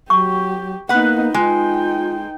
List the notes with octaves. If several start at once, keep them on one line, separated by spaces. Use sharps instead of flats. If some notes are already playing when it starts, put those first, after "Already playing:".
F#3 G4 C#6
A#3 B3 D#4 B4 F#5
G#3 D#4 F4 G5